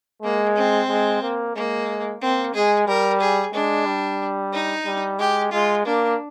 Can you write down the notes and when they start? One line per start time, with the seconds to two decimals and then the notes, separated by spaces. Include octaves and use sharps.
0.23 G#3 A#3
0.56 C4
0.89 G#3
1.23 A#3
1.55 G#3 A#3
2.21 A#3 C4
2.54 G#3 G#4
2.87 G3 A#4
3.21 G#4
3.53 G#3 D4
3.86 G3
4.53 D#4
4.86 G3
5.19 G#3 G4
5.52 G#3 F4
5.85 A#3 D4